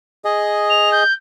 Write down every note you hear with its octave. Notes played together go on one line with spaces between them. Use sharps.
G#4 D#5
F7
G6